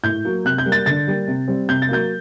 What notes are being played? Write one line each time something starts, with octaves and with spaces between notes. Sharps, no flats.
A2 G6
F#3 A#3
C3 F#6
G6
G3 A#3
A6
D3 A6
G3 A#3
C3
G3 C4
C3 G6
A6
F#3 A#3 G6